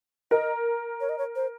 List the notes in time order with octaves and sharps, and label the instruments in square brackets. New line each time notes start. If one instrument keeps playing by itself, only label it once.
[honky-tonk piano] A#4 [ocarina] D#5
[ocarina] C#5
D#5
C#5
C5